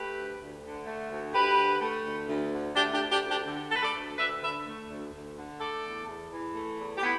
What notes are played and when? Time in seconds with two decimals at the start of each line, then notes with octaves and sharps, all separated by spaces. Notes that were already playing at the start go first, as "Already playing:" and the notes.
Already playing: A3 G4 B4
0.15 D2
0.40 D2
0.64 D3
0.86 A3
1.10 D2
1.34 D2 G4 B4
1.58 D3
1.81 A3
2.06 D2
2.28 D2
2.53 D3
2.76 A3 D4 G4
2.93 D4 G4
3.01 D2
3.11 D4 G4
3.24 D2
3.30 D4 G4
3.47 D3
3.69 A4
3.72 A3 B4
3.83 A4 D5
3.94 D2
4.18 D2 B4 E5
4.42 D3 B4 E5
4.67 A3
4.90 D2
5.13 D2
5.37 D3
5.61 A3 A4 D5
5.84 E2
6.08 E2
6.32 E3
6.55 A3
6.79 E2
6.98 G4
7.03 B3 E4